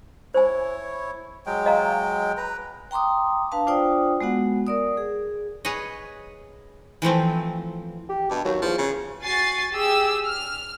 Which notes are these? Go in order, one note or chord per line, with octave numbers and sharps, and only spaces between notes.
E4 C5 C#5 G#5
F#3 G#3 G5
D#5 F5 A#5
B4 A#5
G5 A#5 C6 D6 D#6
D4 B4 F5 A5
D4 F4 C5 D5 G5 D#6
G#3 B3 F#4 F#5
A#4 D5 D#6
G#4
G#4 B4 C#5 D#5
E3 F3 A3 C4
G4
G2 B2
D#2 F#3
E2 F3
C#3
F#4 G#5 A6 C7
G4 G#4 E6
F6